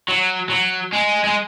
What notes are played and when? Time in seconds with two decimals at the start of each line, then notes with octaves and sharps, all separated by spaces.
0.09 F#3
0.50 F#3
0.93 G#3
1.25 G#3